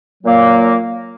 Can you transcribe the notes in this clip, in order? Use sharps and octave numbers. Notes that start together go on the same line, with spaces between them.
A#2 F#3 A#3